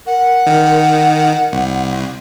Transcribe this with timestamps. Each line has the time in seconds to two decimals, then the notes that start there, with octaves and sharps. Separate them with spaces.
0.07 A#4 F#5
0.46 D#3
1.53 C2